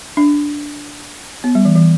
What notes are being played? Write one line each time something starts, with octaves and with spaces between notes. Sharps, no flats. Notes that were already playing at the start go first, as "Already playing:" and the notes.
D4
B3
G3
E3
E3